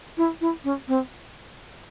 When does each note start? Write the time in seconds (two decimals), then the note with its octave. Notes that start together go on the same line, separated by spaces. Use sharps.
0.17 E4
0.41 E4
0.64 C#4
0.88 C4